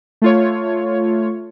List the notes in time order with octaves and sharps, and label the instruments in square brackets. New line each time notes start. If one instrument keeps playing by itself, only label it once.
[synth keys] A3 F4 C#5